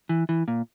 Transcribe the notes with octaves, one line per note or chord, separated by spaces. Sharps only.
E3
E3
A#2